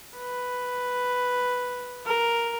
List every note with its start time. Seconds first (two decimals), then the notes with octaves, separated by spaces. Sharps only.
0.17 B4
2.06 A#4